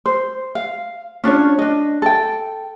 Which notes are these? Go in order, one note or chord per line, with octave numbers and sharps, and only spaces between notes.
C5
F5
C#4 D4 F4 C#5
D4 D#5
A4 G5